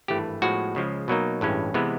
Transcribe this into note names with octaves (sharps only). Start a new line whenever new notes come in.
G#1 G2 E3 A3 G4
A2 F3 G#3 B3 F#4
C#2 C#3 F3 G#3
B2 F#3 A#3 D#4
A1 G2 E3 G#3 C#4
C3 E3 G#3 B3